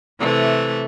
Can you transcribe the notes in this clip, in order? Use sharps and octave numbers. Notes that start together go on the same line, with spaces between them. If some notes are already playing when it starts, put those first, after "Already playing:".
C3 E3 A3